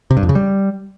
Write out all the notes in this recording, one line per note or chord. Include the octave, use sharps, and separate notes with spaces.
C3
G2
F2
C#3
G3